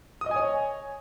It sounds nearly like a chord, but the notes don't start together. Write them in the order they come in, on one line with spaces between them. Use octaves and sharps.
D#6 D#5 G#5 C#5